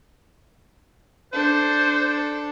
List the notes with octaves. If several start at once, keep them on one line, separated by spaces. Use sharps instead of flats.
D4 A4 C5